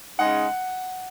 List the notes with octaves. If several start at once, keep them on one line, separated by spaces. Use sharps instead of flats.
C#3 G#3 D#4 F#5